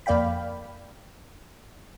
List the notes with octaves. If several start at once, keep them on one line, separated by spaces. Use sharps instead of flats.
F2 A#3 D5 F5 G5 B5